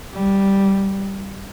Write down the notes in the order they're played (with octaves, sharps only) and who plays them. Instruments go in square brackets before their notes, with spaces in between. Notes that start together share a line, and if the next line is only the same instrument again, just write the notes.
[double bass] G3